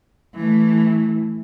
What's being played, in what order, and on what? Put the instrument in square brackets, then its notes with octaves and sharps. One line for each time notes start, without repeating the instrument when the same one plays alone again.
[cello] E3 A3